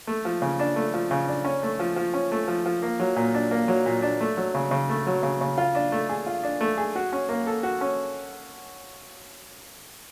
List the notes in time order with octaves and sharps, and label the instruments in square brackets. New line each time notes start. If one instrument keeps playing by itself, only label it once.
[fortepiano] A3
F3
C#3
D4
A3
F3
C#3
D4
C#4
A3
F3
F3
C#4
A3
F3
F3
A#3
F#3
A#2
D4
A#3
F#3
A#2
D4
A3
F#3
C#3
C#3
A3
F#3
C#3
C#3
F4
D4
A3
G#4
F4
D4
A3
G#4
F#4
C#4
A#3
A4
F#4
C#4